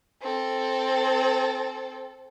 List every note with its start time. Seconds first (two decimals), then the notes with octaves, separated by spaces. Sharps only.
0.22 C4 A4